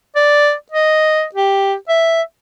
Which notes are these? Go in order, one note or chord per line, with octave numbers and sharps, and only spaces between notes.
D5
D#5
G4
E5